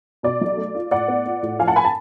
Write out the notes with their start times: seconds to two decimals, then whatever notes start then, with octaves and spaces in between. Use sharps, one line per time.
0.23 B2 D5
0.41 B1
0.57 A3
0.75 F4
0.91 A2 D5 F#5
1.08 B3
1.26 F4
1.43 A2
1.59 F3 F5 G#5
1.67 F#5 A5
1.76 G#5 B5
1.85 A5